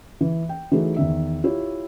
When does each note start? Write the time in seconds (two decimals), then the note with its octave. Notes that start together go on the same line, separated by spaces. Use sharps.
0.21 E3
0.49 G5
0.72 E3 F#3 A3 D#4 F#4 G#4
0.96 E2 D#3 E5
1.44 E4 F4 G4 C#5